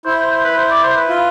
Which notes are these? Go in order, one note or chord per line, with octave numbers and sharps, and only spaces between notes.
E4 C5
C5
C5
B4
C5
D5
C5
B4
F4